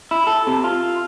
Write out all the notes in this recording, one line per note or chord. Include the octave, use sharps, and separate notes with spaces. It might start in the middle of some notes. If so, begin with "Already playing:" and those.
E4
A4
C3
F4